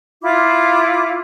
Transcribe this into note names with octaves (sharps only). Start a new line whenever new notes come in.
E4 F4 D6